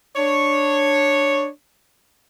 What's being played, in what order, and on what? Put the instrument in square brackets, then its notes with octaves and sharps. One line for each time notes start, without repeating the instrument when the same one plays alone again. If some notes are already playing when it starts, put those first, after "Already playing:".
[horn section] D4 C#5